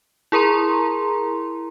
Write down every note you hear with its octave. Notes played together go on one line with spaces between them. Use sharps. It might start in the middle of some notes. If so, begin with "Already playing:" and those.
E4 G#4 A#4 A#5 C6